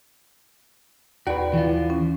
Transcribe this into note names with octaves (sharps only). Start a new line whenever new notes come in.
D#2 F#4 B4 D5
E3 F4
C#4